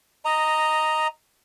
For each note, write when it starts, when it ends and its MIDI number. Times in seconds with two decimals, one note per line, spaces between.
0.25 1.07 75
0.25 1.07 82